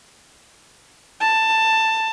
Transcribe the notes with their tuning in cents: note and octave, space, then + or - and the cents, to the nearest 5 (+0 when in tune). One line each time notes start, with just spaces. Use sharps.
A5 +15